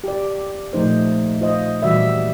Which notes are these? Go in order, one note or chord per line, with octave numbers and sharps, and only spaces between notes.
G4 D5
A#2 F3 A3 D#4 C5
F4 C5 D#5
A#2 E3 G3 F#4 D5 E5